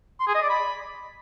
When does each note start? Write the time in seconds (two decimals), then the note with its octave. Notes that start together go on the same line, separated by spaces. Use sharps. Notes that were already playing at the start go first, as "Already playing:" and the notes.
0.20 C6
0.27 G#4
0.35 D#5
0.42 D5
0.49 B5